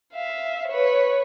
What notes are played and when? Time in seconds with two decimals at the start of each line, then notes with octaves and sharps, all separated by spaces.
0.13 E5 F5
0.69 B4 C#5